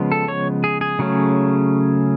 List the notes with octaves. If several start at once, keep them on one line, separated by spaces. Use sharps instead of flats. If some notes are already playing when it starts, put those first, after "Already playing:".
Already playing: C#3 F3 G#3 B3
A4
C#5
G#4
G#4
C#3 F#3 A3 C#4